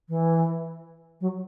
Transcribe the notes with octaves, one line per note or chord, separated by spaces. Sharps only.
E3
F#3